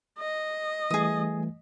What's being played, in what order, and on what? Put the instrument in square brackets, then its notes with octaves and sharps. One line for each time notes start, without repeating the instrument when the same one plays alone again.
[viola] D#5
[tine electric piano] E3 G3 A3 [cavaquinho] G#4 D#6